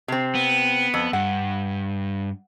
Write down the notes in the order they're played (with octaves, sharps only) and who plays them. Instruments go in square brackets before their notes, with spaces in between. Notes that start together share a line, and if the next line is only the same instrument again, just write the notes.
[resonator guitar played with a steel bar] C3 C4
[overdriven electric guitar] B3
[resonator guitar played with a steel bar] F2
[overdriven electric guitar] G2 [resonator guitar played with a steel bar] F#5